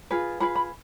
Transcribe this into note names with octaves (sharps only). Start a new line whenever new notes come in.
F4 G#4 B4
F4 G#4 B4 B5
B5